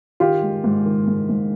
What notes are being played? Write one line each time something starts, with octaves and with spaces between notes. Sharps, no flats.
D#3 F4 G4
G#3
G#2
D#3
G#2
G#2